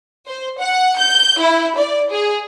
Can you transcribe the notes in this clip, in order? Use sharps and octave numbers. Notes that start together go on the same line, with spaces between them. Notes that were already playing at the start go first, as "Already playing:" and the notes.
C5
F#5
G6
E4
D5
G#4